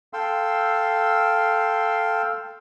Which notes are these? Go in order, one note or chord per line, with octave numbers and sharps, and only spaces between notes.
A4 F5 G5 C6 E6